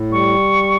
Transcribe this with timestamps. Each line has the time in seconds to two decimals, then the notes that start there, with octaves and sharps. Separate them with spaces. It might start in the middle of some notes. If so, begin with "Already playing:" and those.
Already playing: A2
0.11 G3 C#6